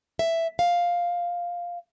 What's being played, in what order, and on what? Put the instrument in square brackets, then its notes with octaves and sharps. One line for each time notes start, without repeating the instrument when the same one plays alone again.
[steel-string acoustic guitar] E5
F5